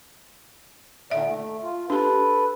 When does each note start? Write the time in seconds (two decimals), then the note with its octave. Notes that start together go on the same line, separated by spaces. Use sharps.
1.10 A#2 D3 D#3 D5 E5
1.27 A3
1.62 F4
1.90 D4 G4 A4 B4